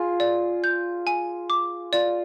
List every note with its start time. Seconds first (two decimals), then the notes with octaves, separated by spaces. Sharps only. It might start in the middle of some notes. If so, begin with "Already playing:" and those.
Already playing: F4 G#4
0.20 D5
0.64 G6
1.07 G#5
1.50 D6
1.93 F4 D5